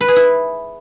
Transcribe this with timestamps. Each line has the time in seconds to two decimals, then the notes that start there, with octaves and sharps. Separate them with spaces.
0.01 B4
0.08 G#4
0.16 E4